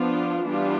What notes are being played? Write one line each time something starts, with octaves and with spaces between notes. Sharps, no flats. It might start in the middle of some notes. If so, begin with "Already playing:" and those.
Already playing: F3 B3 D4 F4
E3 G3 B3 D4 F4